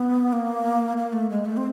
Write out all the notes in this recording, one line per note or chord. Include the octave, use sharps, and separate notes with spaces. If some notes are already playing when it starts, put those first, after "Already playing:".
Already playing: B3
A#3
A#3
A3
G#3
A3
C4